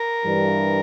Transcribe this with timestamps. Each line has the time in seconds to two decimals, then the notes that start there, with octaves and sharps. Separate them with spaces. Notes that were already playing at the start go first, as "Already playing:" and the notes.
Already playing: A#4
0.24 G2 E3 G3